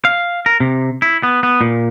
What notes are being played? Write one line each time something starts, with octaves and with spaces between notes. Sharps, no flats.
F5
A#4
C3
E4
B3
B3
A#2